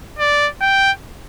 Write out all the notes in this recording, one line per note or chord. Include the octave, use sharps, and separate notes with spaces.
D5
G5